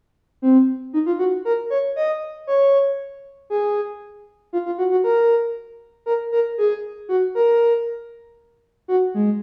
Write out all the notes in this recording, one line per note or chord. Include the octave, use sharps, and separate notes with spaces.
C4
D#4
F4
F#4
A#4
C#5
D#5
C#5
G#4
F4
F4
F#4
F#4
A#4
A#4
A#4
G#4
F#4
A#4
F#4
G#3